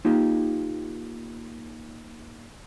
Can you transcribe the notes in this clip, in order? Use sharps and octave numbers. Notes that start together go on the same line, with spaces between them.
A#3 D#4 F4 G4